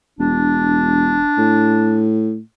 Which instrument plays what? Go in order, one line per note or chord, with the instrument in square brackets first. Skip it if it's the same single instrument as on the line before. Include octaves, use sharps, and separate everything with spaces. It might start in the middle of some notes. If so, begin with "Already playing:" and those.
[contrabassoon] E1 [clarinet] D4
[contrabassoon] A2